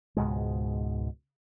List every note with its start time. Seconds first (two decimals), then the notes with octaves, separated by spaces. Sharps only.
0.17 C#2 G#2 B2 G#3